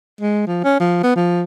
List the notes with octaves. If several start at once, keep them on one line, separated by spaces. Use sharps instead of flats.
G#3
F3
C#4
F3
B3
F3